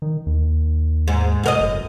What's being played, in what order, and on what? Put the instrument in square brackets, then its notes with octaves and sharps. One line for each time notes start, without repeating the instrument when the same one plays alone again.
[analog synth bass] D#3
D#2
[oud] G#2
F#2 A#4 D#5
[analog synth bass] F#1